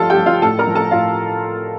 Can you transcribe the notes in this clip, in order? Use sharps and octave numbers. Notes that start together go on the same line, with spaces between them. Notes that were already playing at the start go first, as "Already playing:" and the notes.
Already playing: G2 F3 F4 A4 F5 A5
G4 G5
F3
F4 F5
A2 A4 A5
A#4 A#5
F3
A4 A5
A2 F4 F5